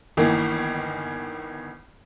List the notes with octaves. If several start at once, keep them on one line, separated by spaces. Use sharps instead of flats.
G1 D#3 E3 A#3